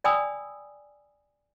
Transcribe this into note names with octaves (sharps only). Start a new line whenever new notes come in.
D5 G5 G#5 B5 D#6 E6